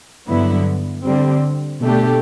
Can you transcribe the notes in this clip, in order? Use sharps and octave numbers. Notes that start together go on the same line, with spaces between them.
G2 D3 F#3 B3 E4
D3 G3 C4
B2 A3 D4 G4